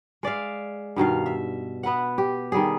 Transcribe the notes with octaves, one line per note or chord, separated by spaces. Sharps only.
G#3 D5 E5 F5
G2 B2 D#3 F5
E5
B3 B4 E5 F#5
G4
D#3 G3 G#4